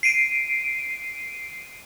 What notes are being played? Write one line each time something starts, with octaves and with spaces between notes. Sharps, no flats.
C7 D7 D#7